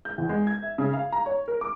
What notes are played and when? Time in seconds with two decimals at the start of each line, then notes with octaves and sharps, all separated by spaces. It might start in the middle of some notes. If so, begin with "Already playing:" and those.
0.05 G6
0.18 E2
0.29 G#3
0.47 G#6
0.62 E5
0.78 C#3
0.93 F5
1.12 A#5
1.26 C#5
1.48 A#4
1.61 D6